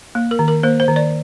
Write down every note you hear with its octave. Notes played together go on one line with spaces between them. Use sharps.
A#3
A#4
D#3
A#4
A#3 C5
C5
D#3
D5